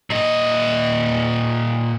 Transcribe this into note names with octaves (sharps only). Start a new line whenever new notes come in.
A#2 D#5